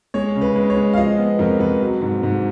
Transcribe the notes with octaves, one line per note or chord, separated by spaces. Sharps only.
G#3 C#5
C#3
B4
G#3
C#5
G#3
F5
F3 D#5
B3
F2 A#4
F2 B4
F#3
G#2
G#2